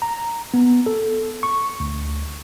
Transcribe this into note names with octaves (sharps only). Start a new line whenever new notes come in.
A#5
B3
A4
C#6
D2